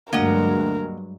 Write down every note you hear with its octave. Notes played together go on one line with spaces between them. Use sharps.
D2 G2 F#3 G#3 A#3 A#4 D#5 F#5